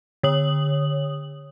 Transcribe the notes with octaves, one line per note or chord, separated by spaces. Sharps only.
D3 C#5 D#6 F#7